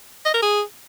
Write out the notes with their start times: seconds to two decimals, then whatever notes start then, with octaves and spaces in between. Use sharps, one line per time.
0.25 D#5
0.34 A#4
0.42 G#4